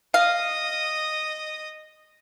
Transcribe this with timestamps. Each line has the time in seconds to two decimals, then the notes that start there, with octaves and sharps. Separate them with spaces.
0.14 D#5 F5 D#6